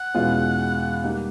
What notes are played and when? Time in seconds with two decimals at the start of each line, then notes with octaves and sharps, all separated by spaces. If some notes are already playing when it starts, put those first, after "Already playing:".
Already playing: F#5
0.14 E2 B2 G#3 C#4 F4
1.04 G3 A#3 D#4